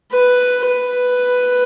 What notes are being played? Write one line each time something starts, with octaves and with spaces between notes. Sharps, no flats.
B4
B4